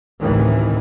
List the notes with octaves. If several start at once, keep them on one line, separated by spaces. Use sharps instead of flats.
A1 D2 A2 C3 D#3 E3